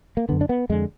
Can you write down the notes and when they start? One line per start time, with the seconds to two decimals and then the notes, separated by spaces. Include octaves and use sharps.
0.17 A#3
0.29 F#2 D3 B3
0.41 D4
0.49 B3
0.69 F2 D3 G#3